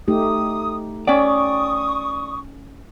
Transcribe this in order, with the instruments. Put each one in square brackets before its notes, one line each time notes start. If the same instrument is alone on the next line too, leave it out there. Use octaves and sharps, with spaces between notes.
[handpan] A3 D#4 G4 [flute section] D#6
[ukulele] C#4 G5 [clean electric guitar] D5 [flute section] C#6 D#6